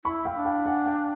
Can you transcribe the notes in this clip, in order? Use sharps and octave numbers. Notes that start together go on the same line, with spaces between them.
E4 B5 C#6
F5 G5
D4
F5 G5
F#5 G#5
F5 G5